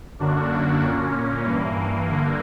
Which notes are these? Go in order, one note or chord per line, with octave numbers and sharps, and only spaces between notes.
F#2 D3 A#3 D4 F#4
A#2 A#3 C#4
G2 E3 A#3
G2 D3 A#3